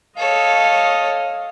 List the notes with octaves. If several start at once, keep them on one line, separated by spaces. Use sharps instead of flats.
A4 C#5 D#5 F5